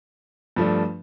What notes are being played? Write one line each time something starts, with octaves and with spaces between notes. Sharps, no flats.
G2 F3 A3 D4